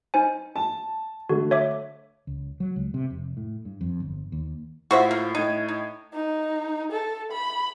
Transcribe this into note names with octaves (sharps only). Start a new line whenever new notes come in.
D#4 C5 G#5
A5
D3 A3 F#4
C#5 E5 D6
C#2
F#3
C#2
C3
F1
A2
G2
F2
G1
D#2
A2 F4 F#4 C5 E5
A#3
A2 D#4 G#6 D#7
D#4
D#4
A4
B5